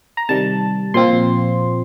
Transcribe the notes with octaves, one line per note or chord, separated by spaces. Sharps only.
A#5
C3 D#3 G3 A5
A#2 F3 C4 F4 C6